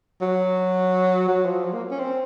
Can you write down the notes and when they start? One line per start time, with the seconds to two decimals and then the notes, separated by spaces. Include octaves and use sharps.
0.22 F#3
1.28 F#3
1.46 F3
1.64 F#3
1.73 A#3
1.91 C#4
1.99 C4